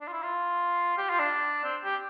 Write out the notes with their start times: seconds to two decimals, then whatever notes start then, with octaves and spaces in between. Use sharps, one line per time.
0.01 D4
0.08 F4
0.12 E4
0.23 F4
0.98 G4
1.10 F4
1.19 D4
1.64 C4
1.84 G4